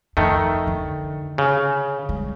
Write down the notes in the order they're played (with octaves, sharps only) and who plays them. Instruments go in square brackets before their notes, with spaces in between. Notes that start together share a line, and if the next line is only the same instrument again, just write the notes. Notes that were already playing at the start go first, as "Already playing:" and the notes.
[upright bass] F2 [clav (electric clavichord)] D#3 A3
[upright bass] D3
[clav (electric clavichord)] C#3
[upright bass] G3 G#3